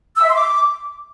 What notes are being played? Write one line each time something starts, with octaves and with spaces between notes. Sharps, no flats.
E6
E5
C6
D6